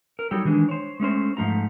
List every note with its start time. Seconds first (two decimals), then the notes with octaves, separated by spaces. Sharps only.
0.19 A#4
0.31 F#3 G3 D#4 G4 A4
0.45 D#3 E3 G#3 D4
0.69 C5 C#5
1.00 G#3 A3 C#4 C5
1.37 G#2 F3 A3 F4 A#5